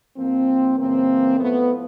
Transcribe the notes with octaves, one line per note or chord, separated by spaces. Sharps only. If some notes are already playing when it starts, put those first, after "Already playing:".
G#2 F3 A#3 C4
F#2 C#3 E3 A#3 C4
A2 F3 A3 B3